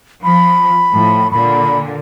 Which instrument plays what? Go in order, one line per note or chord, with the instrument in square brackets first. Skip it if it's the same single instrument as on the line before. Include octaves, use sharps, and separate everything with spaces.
[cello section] F3 [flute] B5
[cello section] A2 F3
[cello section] A#2 D3 [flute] B5